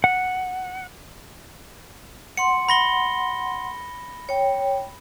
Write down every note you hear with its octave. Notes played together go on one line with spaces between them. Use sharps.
F#5
F#5 C6 C#7
B5 A#6 G7
C#5 G5